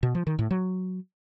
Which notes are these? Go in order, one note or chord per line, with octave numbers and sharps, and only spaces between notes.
B2
F3
D#3
A2
F#3